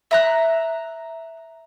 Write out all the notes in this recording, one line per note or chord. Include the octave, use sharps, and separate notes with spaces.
E5 A#5 F#6